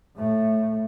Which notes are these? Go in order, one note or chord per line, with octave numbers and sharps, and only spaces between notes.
A2 A3